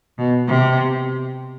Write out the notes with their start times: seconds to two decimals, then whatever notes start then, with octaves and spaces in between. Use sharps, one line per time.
0.18 B2
0.48 C3